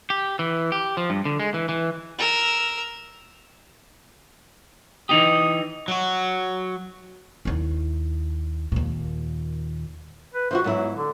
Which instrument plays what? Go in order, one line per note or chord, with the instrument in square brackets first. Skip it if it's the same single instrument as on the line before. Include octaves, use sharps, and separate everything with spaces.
[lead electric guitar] G4
E3
G4
F3
G2
D3
G#3
E3
E3
[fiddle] A#4 E6
[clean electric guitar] E3 D#4 G4 [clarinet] D#6
[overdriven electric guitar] F#3 F#4
[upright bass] D#2 E4
D#2 A#2
[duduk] B4
[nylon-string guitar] E3 F4 F#4 [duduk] C5
[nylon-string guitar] G#2 B3 E4 [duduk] F#3
[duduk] D3